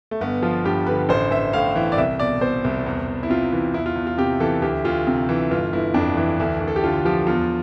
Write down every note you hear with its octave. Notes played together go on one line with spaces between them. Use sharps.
A3
G1 B3
F3 F4
G2 G4
D3 B4
A1 C5
A1 E5
A2 F5
E3
D5
C2 E5
B2 D5
B2 C5
C2
E2
E2
E4
C3 F4
E3
E2 E4
F4
E2
F4
C3 G4
E3 A4
D2 G4
D2 F4
C3
E3
G1 F4
G1 E4
F2 D4
E3
D2
D2
A4
G4
D3 F4
F3 G4
E2 F4